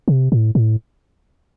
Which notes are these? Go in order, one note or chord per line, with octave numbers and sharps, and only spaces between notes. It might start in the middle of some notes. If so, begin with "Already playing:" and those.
C3
A2
A2